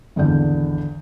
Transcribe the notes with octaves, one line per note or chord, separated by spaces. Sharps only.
G#1 E2 D3 D5 G6